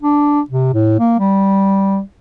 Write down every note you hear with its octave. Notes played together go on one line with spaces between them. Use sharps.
D4
C3
A2
A#3
G3